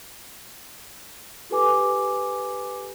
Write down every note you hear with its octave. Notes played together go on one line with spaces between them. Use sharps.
F4 G4 A4 B4 G#5 D6